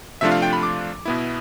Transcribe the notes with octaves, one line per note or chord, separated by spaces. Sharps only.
C3 F3 A3 D4 F4 E5
F5
G5
B5
D6
B2 B3 E4